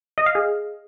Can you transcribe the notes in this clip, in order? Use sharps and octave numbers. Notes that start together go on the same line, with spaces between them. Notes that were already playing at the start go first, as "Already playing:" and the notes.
D#5
F5
G#4